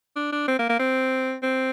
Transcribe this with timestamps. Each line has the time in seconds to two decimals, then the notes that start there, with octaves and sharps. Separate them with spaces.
0.16 D4
0.32 D4
0.48 C4
0.59 A#3
0.70 A#3
0.79 C4
1.43 C4